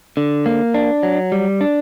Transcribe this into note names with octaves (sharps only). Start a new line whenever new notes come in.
D3
A#3
D4
F#3
G3
D4